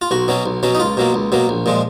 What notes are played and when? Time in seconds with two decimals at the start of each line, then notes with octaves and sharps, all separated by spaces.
0.02 F4
0.11 B1 F#4
0.28 B2 F#3 C#4
0.46 B1
0.63 B2 F#3 C#4
0.75 D#4
0.80 C#2 F4
0.97 B2 F#3 A#3
1.14 C#2
1.32 B2 F#3 A#3
1.49 A#1
1.66 A#2 F3 G#3